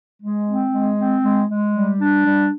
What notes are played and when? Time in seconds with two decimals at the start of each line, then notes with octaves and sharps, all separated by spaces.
0.22 G#3
0.47 C4
0.73 G#3
0.98 C4
1.23 G#3
1.49 G#3
1.74 G3
2.00 D4
2.25 G3